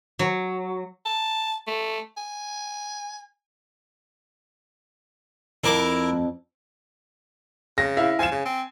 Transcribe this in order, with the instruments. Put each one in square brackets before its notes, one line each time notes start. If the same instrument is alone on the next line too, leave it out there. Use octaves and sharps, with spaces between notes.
[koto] F#3
[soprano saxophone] A5
A3
G#5
[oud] F2 [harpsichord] E4 A#4 D6
[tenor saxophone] C#3 [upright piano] A#6
[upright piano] E4 E5 F5
[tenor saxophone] F3 [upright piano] G#5 E7
[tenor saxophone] C#3
C4